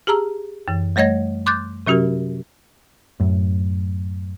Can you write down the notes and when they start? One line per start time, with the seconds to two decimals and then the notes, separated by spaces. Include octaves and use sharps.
0.07 G4 G#4 A5 A#5 E6
0.68 F#2 E3
0.96 G3 A3 C#5 D#5 G#6 A#6
1.46 C6 D6 F#6 G6 A6
1.86 C3 F#3 C#4 F#4 G4 A#4
3.20 F#2 A2